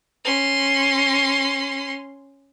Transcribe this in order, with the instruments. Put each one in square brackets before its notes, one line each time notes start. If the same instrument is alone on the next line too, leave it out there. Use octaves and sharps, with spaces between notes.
[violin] C#4 C6